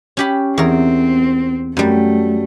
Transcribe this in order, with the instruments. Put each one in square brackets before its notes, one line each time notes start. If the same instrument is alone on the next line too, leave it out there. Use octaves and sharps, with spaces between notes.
[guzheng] C#4 G4 B5
[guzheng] E2 A#4 [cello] C4
[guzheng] F#2 G3 [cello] A3